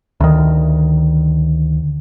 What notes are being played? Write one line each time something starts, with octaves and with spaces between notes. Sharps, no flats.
D2 D#3